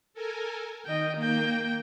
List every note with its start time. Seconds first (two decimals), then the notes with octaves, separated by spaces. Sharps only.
0.14 A4 A#4 G#5
0.86 D#3 D#5 G5
1.17 A#3 G5